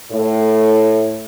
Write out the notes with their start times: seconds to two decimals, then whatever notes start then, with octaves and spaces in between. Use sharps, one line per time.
0.11 A2